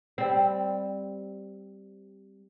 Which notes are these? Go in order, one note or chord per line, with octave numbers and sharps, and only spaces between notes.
G3 C4